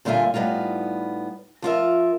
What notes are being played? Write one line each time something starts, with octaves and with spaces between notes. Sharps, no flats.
A#2 D3 G3 F4 E5 G#5
A2 G3 B3 D#4 F4
F3 F4 A#4 E5